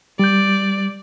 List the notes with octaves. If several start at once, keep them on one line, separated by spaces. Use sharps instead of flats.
G3 D5 G6